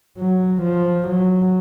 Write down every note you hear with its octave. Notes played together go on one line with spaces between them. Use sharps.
F#3
F3
F#3